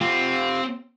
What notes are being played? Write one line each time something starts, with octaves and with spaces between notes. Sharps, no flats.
C4 F4 G4